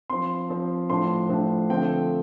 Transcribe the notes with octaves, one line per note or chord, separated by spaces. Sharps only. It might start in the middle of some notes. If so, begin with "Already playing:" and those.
F3 C4 C6
F3 C4
A2 F3 D4 C6
A2 F3 D4
D3 F3 A3 C4 G5